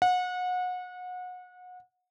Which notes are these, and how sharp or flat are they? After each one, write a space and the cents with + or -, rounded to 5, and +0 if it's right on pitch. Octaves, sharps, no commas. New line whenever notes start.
F#5 -30